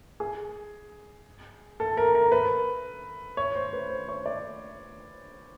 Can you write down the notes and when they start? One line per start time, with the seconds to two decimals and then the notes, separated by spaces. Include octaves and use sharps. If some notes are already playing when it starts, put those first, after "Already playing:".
0.20 G#4
1.80 A4
1.97 A#4
2.15 A#4
2.32 B4
3.37 C#5
3.55 C5
3.73 B4
3.90 C5
4.09 C#5
4.26 D5